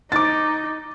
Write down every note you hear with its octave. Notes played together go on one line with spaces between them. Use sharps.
D#4 D6 A6